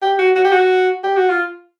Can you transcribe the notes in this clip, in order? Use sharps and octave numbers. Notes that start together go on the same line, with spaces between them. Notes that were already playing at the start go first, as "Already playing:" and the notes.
G4
F#4
F#4
G4
F#4
G4
F#4
F4